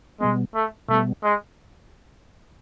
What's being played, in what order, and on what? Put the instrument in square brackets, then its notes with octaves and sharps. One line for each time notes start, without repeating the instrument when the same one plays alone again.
[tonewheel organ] B2 G3 B3 [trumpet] G#3
[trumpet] A3
[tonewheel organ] B2 G3 B3 [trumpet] A3
[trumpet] G#3